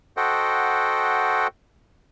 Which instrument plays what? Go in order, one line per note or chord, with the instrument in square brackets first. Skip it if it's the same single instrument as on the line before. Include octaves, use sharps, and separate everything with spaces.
[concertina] F#4 A4 C5 D#5 F#5 G5